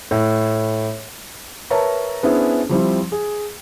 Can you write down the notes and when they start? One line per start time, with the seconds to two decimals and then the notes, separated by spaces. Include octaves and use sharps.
0.11 A2
1.70 A#4 B4 C#5 E5 A5 A#5
2.23 B3 C#4 D4 E4 G#4 C5
2.69 F3 G3 C4 E4
3.12 G#4